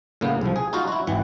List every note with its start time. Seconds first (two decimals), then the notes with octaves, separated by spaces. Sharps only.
0.21 A2 C#3 A#3 B3
0.41 C2 F3
0.56 G#4
0.73 D#4 F4 F#4 F5
0.88 E4 F#4
1.07 G#1 E3 F#5